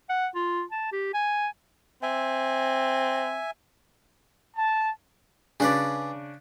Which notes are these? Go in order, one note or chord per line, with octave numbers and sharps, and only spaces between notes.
F#5
F4
A5
G4
G#5
C4 E5 G#5
A5
C#3 D4 G#4 B4 D5